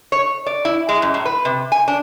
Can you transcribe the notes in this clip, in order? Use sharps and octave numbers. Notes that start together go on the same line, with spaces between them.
C#5
D5
E4
G#3
F#2
A2
B4
C3
G#5
D4